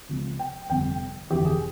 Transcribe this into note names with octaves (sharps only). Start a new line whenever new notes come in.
C#2 C3 F3 G#3
G5
G1 F2 C3 G3 G5
G1 F2 C3 E3 G4
G#4